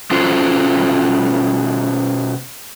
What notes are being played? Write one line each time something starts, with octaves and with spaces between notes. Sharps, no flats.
B2 C#4 F4 F#4 A4 C5